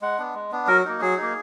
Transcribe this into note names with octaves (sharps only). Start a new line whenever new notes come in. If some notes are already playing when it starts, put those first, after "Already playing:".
G#3 F#5
B3 D4
G#3
B3 D4
F#3 A#4
A#3 D#4
F#3 G#4
A#3 D#4